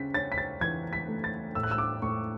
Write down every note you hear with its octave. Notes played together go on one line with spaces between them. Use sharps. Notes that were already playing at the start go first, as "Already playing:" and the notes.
Already playing: C#3 B6
C#4 A6
B6
A6
E3 G#6
B6
A3
A6
A2 E6
F#6
E6
D6
A2 C#6